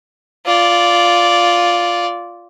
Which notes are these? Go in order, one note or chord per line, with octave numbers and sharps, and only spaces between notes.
F4 D5